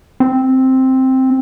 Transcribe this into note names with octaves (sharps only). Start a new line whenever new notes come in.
C4